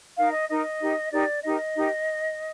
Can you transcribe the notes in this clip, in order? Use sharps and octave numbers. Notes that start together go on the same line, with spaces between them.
D#4 A#4 F5
D#5
D#4 A#4 D#5
D#4 G4 A#4
D#4 G4 A#4 D5
D#4 G4 A#4 D#5
D#4 G4 A#4